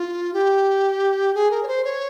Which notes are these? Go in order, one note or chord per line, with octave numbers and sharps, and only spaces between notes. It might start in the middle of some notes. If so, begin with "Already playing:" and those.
Already playing: F4
G4
G#4
A#4
C#5
C5
C#5